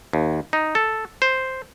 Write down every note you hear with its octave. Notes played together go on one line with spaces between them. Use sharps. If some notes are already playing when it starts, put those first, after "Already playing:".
D#2
D#4
A4
C5